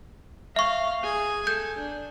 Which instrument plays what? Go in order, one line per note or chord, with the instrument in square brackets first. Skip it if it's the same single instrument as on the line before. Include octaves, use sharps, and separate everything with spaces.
[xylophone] E5 C#6 [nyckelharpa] F5
[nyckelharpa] G#4 G#5
[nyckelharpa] A4 [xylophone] G6
[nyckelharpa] D4